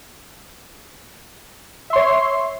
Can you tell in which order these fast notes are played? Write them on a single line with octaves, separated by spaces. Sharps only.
E5 C6 C#5